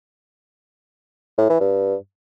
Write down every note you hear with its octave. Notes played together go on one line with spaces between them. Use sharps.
A2
E3
G2